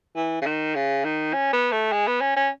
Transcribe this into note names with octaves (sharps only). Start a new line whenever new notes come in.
E3
C#3
D#3
C#3
D#3
C#4
B3
A3
G#3
B3
C#4
C#4